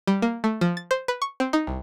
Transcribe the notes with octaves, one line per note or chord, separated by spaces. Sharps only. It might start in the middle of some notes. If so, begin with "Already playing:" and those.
G3
A#3
A3
F3
A6
C5
B4
C#6
C4
D#4
C2